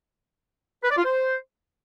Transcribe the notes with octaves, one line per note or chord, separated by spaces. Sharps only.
B4
D5
F4
C5